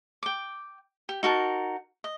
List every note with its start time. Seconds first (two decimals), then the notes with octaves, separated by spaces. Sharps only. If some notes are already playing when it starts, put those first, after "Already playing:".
0.23 G5 D6
1.09 G4
1.23 D#4 F#4 A#4 A5
2.04 D#5